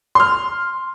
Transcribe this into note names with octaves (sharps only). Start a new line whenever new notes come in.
C6 F6